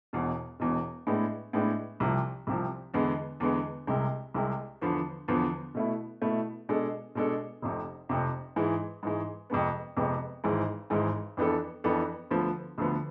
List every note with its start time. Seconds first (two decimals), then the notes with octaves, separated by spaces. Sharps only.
0.13 E1 E2 B2
0.60 E1 E2 B2
1.07 A2 G#3 B3 D4
1.53 A2 G#3 B3 D4
2.00 C2 C3 F3
2.47 C2 C3 F3
2.94 E2 D3 G#3 B3
3.40 E2 D3 G#3 B3
3.87 C2 C3 G#3
4.34 C2 C3 G#3
4.81 E2 D3 F3 B3
5.28 E2 D3 F3 B3
5.75 B2 A3 E4
6.22 B2 A3 E4
6.69 B2 G#3 D4 A4
7.15 B2 G#3 D4 A4
7.62 F1 F2 C3
8.09 F1 F2 C3
8.56 G#2 E3 G#3
9.03 G#2 E3 G#3
9.50 F2 C3 G#3 B3
9.97 F2 C3 G#3 B3
10.44 G#1 G#2 E3 G#3
10.90 G#1 G#2 E3 G#3
11.37 F2 E3 B3 D4 A4
11.84 F2 E3 B3 D4 A4
12.31 D2 D3 F3 B3
12.78 D2 D3 F3 B3